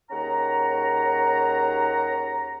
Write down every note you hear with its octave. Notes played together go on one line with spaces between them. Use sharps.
D#2 C#4 G#4 F#5 A#5